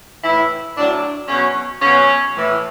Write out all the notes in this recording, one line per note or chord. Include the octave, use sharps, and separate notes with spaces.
A2 E3 E4
A2 F#3 D4
B2 F#3 C#4
B2 F#3 C#4
A2 E3